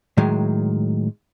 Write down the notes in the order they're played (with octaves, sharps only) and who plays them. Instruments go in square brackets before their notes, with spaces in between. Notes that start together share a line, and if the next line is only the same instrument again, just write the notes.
[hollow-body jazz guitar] A2 D#3 F#3 G#3